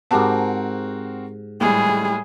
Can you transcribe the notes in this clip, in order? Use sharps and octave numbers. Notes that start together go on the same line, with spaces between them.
G#2 C4 F#4 G4 A#4 A5
A2 G3 G#3 G#4